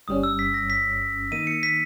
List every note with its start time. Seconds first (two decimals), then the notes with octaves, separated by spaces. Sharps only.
0.08 G1 G2 G3 C#4 D#6
0.23 E6
0.39 B6
0.54 A#6
0.70 B6
1.32 D#3 A#3 D#4 D#7
1.47 C#7
1.63 B6